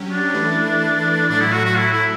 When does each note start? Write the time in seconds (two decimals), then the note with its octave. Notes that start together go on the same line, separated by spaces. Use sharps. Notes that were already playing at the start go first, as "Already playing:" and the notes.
Already playing: F#3 C#4 G4
0.10 D4
0.34 E3 A3 E4
1.29 A2 F#3 A3 D4
1.41 E4
1.53 F#4
1.65 F#4
1.77 E4
1.93 E4